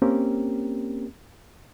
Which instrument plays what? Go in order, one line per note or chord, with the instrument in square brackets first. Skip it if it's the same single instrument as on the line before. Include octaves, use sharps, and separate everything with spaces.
[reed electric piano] A#3 C4 C#4 G4 A#4